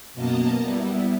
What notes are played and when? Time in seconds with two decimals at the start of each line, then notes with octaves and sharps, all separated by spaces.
0.14 F#2 B2 A#3 D#5 A5 A#5
0.61 G3 B3 E4